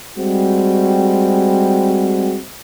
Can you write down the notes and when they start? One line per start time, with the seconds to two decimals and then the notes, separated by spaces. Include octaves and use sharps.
0.18 G3 G#3 C4 F#4